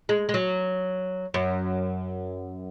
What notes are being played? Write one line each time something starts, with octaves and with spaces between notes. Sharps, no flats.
G#3
G#3
F#3
F#2